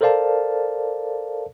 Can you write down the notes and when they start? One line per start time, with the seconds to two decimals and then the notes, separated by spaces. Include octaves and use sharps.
0.01 A4 A#4 C5 D5 F5 A5